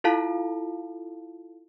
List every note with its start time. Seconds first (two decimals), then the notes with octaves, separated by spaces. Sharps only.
0.04 E4 F4 A4 F5 A5